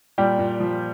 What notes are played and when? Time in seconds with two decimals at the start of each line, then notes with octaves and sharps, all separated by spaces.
0.18 A#2 G3 G4
0.39 A#2
0.60 F3